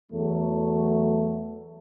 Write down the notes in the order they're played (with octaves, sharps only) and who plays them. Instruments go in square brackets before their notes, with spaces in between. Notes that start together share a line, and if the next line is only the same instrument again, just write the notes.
[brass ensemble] E2 F#3 A3